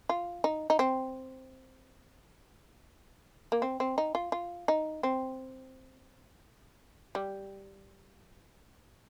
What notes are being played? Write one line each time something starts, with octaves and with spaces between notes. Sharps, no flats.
F4
D#4
D#4
C4
A#3
C4
C4
D#4
F4
F4
D#4
C4
G3